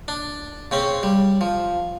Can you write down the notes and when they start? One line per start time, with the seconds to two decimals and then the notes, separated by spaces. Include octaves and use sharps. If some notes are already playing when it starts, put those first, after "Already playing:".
0.08 D4
0.71 C#3 C4 C#4
1.03 G3
1.41 F3